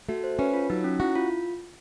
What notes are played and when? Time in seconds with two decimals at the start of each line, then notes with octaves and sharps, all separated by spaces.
0.09 A3 F#4
0.24 C5
0.39 C#4 B4
0.54 F4
0.70 F#3 D#4
0.84 C#4
1.00 E4 F#4
1.15 F4